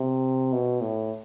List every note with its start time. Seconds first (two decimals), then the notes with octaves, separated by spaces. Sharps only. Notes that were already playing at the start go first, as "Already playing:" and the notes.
Already playing: C3
0.53 B2
0.81 A2